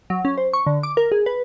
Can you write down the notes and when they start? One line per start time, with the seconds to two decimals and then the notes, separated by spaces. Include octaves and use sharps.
0.10 F#3
0.25 C#4
0.37 C5
0.53 C#6
0.67 D3
0.83 D6
0.97 A#4
1.12 G#4
1.26 B4